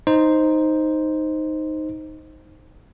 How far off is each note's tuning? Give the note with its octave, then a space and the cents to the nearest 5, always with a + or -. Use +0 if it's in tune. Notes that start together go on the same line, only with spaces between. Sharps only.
D#4 +0 C5 +0